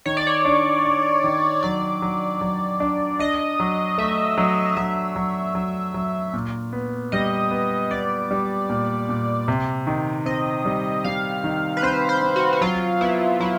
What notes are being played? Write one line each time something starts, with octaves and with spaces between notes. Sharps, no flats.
D#3 C#5
D5
C#5
D4
D4
D#3
F#3 D5
F#3
F#3
D4
D4 D#5
F#3
A3 E5
F#3
F#3 E5
F#3
F#3
F#3
A#2
B3
G3 D#5
B3
B3 D5
G3
A#2
A#2
C3
D#3
C4 D#5
G3
G3 F5
D#3
B4
C4 C5
C5
C4
F#4
F#4
F#3 F4
B3 E4
F#3 E4